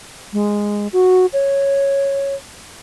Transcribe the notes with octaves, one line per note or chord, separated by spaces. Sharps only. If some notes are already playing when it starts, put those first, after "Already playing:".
G#3
F#4
C#5